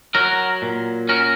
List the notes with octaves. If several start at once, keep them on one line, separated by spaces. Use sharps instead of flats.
F#3 F#4 A#4
A#2
C#4 F#4 A#4